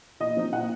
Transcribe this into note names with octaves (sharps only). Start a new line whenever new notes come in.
A#2 D#5
F3 C4 D#4
A#2 F#5